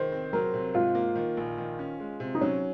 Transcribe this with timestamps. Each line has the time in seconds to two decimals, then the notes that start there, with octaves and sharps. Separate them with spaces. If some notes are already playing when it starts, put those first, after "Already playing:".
Already playing: D#3 C5
0.12 C4
0.33 F#3 A#4
0.54 C3
0.74 G#2 F4
0.95 A#3
1.15 D#3
1.37 A#1
1.58 D#3
1.79 C#4
2.00 G#3
2.20 C3
2.35 D#4
2.41 F#3 C#4